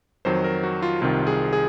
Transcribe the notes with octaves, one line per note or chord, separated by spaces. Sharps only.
F2 D#3 F#3 C5
A#4
F#4
F4
C2 C3 D#3 F4
G#4
G#4